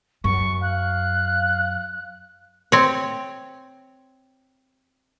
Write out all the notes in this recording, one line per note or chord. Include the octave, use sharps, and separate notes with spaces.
F#2 C#6
F5 F#6
C4 C#5